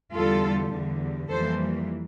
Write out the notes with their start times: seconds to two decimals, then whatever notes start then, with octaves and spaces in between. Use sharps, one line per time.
0.13 E2 D3 G3 F4 A4
0.71 E2 D3 G3
1.29 F2 E3 G3 A#3 A4 C5